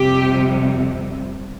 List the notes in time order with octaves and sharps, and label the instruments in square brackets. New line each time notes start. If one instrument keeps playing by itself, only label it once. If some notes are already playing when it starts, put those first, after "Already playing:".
Already playing: [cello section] F2 C3 G3 G4